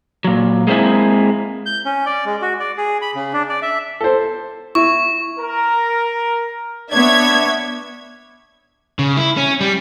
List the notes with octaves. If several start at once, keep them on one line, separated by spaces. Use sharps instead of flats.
A#2 F#3
G#3 A#3 C4 E4 G#4
G6
C#4
D5
G#3
F#4
D5
G#4
B5
C#3
D4
D5
E5
A4 C5
E4 C#6
A#4
B3 D4 C#5 E5 G#6
C#3
E4
C#4
G3